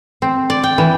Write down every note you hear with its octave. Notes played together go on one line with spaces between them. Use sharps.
C4
D5
G5
E3